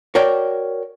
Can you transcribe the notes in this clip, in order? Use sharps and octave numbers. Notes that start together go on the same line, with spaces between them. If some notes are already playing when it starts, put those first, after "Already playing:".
F#4 A#4 C#5 D5 G5